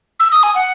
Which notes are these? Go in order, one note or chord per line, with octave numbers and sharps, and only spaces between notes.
E6
D#6
G#5
F#5